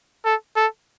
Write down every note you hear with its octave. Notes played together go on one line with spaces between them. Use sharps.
A4
A4